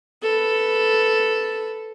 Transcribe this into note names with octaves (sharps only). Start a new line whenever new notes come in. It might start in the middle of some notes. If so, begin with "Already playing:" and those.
A4 B4